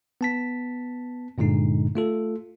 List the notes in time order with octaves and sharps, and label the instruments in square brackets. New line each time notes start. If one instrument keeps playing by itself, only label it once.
[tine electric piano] B3 A5 B6
G2 A#2 D3 G#3 D#4
A3 F4 A4